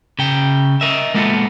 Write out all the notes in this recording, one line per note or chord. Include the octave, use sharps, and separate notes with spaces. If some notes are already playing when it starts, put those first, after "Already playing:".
C#3 G5
A#4 D#5 E5
G#3 A#3 B3 F4 A4